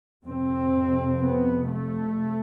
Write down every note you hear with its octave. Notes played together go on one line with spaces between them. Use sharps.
F2 C3 C4
B3
A3